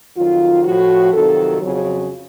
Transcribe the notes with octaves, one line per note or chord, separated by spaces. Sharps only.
F2 D#3 F#3 F4
A2 F3 F#4
F2 C3 D#3 F#3 A4
F2 C#3 F#3